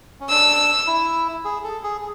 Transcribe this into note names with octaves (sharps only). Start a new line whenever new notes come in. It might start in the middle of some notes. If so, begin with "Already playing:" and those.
C#4
D4 E6
E4
G#4
A4
G#4